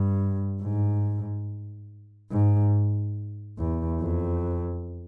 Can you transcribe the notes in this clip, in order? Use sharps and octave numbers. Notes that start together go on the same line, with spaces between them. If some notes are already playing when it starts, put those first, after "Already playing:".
Already playing: G2
G#2
G#2
E2
F2